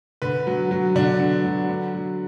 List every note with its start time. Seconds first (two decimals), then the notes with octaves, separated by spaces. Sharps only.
0.22 D3 B4
0.47 F#3
0.71 F#3
0.95 D3 D4
1.19 D3
1.44 F#3
1.69 D3
1.94 F#3